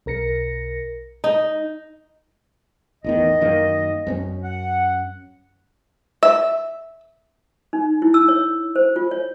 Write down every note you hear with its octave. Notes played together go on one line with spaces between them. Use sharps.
B1 A#4 A#6 C#7
D#4
A1 E2 D#3 D#5
F#2 D#3 A#3
F#2 C4 C#4
F#5
E5
D#4
E4
E6
C#5
C5
F4
C#5